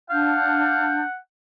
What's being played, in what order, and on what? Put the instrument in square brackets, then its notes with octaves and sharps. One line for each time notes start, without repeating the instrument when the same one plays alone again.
[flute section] D4 G6 [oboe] F5 [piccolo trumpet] F#5